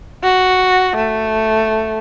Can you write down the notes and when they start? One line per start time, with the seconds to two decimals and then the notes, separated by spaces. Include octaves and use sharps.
0.23 F#4
0.96 A3